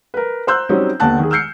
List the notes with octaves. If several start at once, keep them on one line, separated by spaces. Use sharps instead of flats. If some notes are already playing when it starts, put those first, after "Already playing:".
A#4 B4
C5 A#5 C6 E6 F#6 G6
F#3 G3 C4 C#4 D#4
D#2 D3 B3 A5 F#6
D#3 G#4
E6 F6 G6 C7 C#7